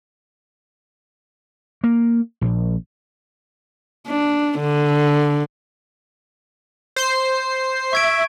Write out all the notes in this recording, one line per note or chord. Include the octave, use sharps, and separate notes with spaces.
A#3
A#1
D4
D3
C5 C7
E5 C#6 G#6 D7